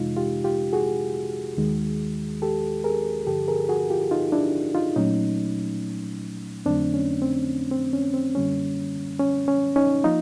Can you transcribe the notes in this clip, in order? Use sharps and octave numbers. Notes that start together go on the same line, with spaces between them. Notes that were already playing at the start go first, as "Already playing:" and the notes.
Already playing: F2 C3 E3 G#3 D#4 F4
F4 G4
F4 G4
F#4 G#4
D#2 D#3 G#3
G4 A4
G#4 A#4
G2 D3 F3 G4 A4
G#4 A#4
F#4 G#4
F4 G4
D#4 F4
D4 E4
D#4 F4
A#2 F#3 A3 C#4 D#4
F2 D3 F#3 A3 C4 D4
C#4
C4
C4
C#4
C4
F#2 D3 G3 A#3 C#4
C#4
C#4
C#4 D#4
F3 A#3 D#4 F4